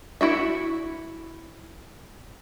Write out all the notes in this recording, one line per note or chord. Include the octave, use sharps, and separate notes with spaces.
E4 F#4 E5